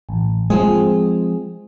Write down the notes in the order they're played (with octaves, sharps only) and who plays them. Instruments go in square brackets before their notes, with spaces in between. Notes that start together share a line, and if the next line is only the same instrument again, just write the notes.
[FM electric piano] A1
[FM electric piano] F3 C4 G#4 [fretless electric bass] G#3